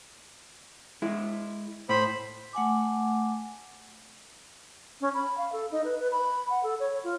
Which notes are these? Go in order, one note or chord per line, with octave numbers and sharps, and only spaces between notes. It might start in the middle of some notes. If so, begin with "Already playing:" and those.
G#3 E4
A2 C5 B5
A3 F#5 G#5 D6
C#4
B5
F5
A4
D#4
B4
B4
B5
F#5
A4
C#5
F4